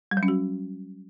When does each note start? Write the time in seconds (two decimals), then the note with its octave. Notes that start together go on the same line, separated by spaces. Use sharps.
0.11 G3
0.17 F#3
0.23 C#4
0.28 F#4